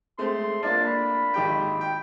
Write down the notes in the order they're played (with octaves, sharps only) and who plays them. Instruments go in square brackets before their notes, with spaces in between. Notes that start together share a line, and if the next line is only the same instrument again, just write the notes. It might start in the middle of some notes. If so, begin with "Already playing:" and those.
[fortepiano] G#3 A3 C4 [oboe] C6
[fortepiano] A#3 D4 F4 [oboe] A5
[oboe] B5
[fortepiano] G#1 G4 G5
G5